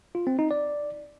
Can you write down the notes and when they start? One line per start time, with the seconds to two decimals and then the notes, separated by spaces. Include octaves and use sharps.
0.15 F4
0.27 C4
0.39 D#4
0.51 D5